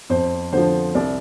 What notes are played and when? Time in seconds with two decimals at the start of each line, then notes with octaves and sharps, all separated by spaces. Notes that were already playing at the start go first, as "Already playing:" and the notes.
0.10 F2 C5
0.53 D3 F3 C5
0.95 C2 D5